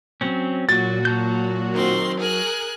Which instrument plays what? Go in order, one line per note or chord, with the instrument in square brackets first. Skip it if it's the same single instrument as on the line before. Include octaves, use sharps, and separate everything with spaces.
[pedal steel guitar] F#3 C4 C#4
[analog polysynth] A#2 F#4 [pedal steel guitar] F#3 [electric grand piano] A6
[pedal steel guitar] F#3 A5 G6
[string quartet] D#3 C4 C6
G#4 A#4 F#6